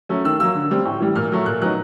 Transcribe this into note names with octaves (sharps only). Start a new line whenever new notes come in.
F#3 A3 C#4
D#3 E6
F#3 A#3 E6
D3
G3 C4
A2
E3 G3
A#2 F6
F#3 A3
A#2 F#6
F#3 B3 D#4 F#6